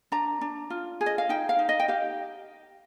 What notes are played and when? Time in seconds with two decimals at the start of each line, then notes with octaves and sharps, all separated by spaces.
0.12 D4 A#5
0.41 D4
0.70 F4
1.01 G#4
1.06 D#5
1.18 F5
1.29 D#4 G5
1.49 F5
1.59 D#4
1.69 D#5
1.80 G5
1.88 G4 F5